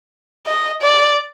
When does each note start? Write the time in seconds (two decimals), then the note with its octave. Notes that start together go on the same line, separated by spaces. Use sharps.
0.46 D#5
0.82 D5